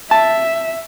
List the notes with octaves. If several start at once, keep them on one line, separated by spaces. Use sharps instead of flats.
E5 A5